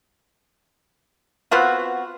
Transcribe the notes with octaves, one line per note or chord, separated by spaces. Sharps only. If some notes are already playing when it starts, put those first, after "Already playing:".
B3 C4 F4 F#4